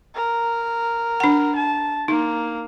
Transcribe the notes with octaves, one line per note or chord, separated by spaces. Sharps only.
A#4
D4 F#5
A5
A#3 D#4